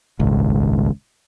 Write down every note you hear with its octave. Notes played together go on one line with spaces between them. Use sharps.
D#1 G#1 C#2